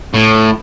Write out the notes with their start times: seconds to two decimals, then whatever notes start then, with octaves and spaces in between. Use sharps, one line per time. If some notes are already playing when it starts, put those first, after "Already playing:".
0.14 A2